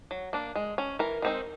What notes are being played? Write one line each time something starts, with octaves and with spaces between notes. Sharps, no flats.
F#3
A#3 D4
G#3
C#4
E3 A#4
G#3 C4 D#4